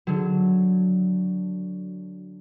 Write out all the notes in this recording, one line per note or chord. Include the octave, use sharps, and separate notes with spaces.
D3 F#3